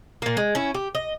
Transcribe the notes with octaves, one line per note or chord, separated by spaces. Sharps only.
A#2 A#3
G#3
C#4 E4
G4
D#5